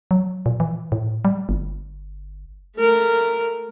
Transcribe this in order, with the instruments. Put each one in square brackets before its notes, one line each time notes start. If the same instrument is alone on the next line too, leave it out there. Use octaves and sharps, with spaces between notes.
[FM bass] F#3
A#2
E3
A2
G3
G1
[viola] A3 A#4